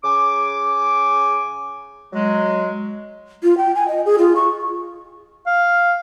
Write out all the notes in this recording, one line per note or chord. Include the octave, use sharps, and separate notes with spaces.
C#3 G#5 D6
F#3 G#3
F4
G5
G#5
D#5
G#4
F4
C#6
F5